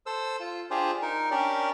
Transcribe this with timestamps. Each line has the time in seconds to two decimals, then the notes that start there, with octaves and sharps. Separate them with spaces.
0.06 A4 C5 E6
0.40 F4
0.71 D4 F4 G4 G#4 C5
1.02 D#4 A#4
1.31 C#4 D4 G4 A#4 D5